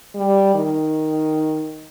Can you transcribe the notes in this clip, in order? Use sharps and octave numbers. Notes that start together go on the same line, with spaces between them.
G3
D#3